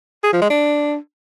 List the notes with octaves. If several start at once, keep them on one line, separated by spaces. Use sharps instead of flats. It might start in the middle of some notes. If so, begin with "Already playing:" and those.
G#4
F3
G#3
D4